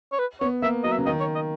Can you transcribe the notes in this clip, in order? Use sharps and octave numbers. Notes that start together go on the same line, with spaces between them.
C#5
B4
B3 C#5
A#3 E5
F#3 D#5
E5
C#3
D#3 D#5
C#5
D#5